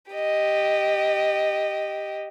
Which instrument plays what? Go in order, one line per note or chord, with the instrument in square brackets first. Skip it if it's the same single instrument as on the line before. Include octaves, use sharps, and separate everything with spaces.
[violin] G4 D#5